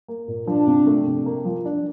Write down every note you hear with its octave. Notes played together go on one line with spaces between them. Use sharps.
A#3
A#2
F3 D4
C3
A3
C3
A#3
F3
D4